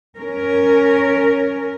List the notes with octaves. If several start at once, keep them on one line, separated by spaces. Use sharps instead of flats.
C#4 A#4